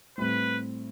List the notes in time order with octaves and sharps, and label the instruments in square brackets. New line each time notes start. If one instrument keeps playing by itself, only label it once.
[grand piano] A2 G3 C4 [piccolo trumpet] B4